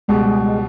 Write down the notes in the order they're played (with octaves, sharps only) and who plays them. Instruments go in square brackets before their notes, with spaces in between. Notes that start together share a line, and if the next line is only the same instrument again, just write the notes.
[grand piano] C#2 B2 G3 [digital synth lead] G#3
[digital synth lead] G#3
G#3